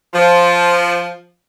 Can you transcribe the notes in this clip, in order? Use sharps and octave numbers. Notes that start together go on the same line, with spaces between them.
F3